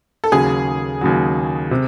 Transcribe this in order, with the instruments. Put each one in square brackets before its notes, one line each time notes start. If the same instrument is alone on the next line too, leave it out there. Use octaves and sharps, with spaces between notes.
[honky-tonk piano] A4
[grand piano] D#2 C#3 F#3 [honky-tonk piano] G#4
[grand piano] D#2 C#3 F#3
C3